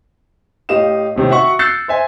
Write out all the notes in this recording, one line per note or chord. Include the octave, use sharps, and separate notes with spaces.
A2 G4 D#5 F5 E7
A2 C3 D#3
F#4 E5 F#5 C#6
E6 F#6 G6 A6 C7 C#7
C5 E5 G#5